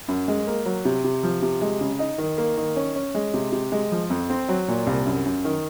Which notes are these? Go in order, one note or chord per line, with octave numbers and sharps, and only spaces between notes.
F#2
G#3
A#3
F#3
C3
C3
F3
C3
G#3
C#3
D#4
D#3
A#3
D#3
C#4
C#4
G#3
C3
C3
G#3
F3
F2
C4
F#3
A#2
C2
F#2
F#2
D#3